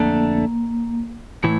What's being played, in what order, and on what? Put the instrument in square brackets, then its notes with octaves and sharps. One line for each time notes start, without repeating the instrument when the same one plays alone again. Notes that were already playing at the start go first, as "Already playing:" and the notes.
Already playing: [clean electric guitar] F2 D3 A3 D4 A4 [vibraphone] A#3
[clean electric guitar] A2 E3 [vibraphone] A3